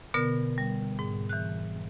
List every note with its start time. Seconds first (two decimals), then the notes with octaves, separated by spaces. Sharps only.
0.14 B2 D3 B3 A#4
0.58 G3
0.99 G#2
1.29 E3 F#6